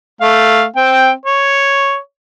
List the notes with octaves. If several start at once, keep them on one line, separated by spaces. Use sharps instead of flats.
A3 F5
C4 G5
C#5